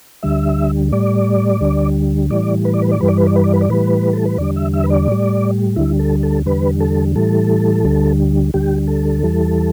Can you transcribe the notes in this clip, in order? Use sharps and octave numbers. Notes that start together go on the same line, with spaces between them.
D2 D3 G3 E5
A2 G3 D5
D2 D3 G3
A2 E3 G3 D5
B4
D5
B4
D5
G2 E3 G3 B4
D5
B4
D5
B4
D5
B4
D5
A2 E3 G3 B4
A4
B4
E2 D3 G3 D5
E5
E5
B4
D5
A2 G3
D2 D3 G3 E4
A4
A4
E2 D3 G3 B4
A4
A2 E3 G3 A4
D2 D3 G3
D2 D3 G3 G4
A4
E2 E3 G3